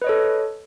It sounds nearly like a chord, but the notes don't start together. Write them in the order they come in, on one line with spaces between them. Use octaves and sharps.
B4 D#5 C#5 A4